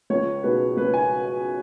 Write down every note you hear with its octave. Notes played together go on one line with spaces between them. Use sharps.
C#2 C#5
B2 G#3 D#4 B4
C#2 B4
G#5